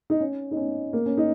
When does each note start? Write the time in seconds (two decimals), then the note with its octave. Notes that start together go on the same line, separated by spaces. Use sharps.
0.10 D#4
0.20 C#4
0.51 D#4
0.57 C#4
0.93 A#3
1.06 C#4
1.17 D#4